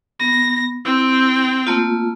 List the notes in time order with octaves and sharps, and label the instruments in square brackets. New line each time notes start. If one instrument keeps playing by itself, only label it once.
[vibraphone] B3 [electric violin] A#6
[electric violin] C4 G5 [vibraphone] E4
[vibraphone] A3 A#3 F4